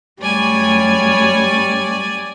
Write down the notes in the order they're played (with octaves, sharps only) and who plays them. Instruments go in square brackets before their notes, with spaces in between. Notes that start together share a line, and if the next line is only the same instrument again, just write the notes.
[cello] F#2 A3 [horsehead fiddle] G3 [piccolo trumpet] C#5 [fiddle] D5 G#5